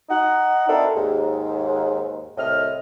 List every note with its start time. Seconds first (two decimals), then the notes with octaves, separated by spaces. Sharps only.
0.09 D#4 F#5
0.68 C4 D4 E4 F#4 A4 A#4
0.95 D#2 G#2
2.37 C2 A2 C3 D#5 F6